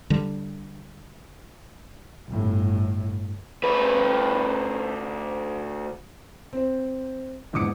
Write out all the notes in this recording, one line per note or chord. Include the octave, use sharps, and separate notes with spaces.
D3 G3
G1 A2
D2 B4
C4 C5
A#1 E2 G#2 D6 D#6 C#7